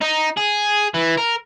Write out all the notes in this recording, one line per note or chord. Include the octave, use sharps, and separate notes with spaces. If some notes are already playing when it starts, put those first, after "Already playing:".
D#4
G#4
E3
A#4